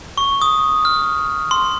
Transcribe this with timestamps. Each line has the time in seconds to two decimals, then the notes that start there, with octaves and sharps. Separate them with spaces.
0.18 C#6
0.42 D#6
0.85 F6
1.51 C6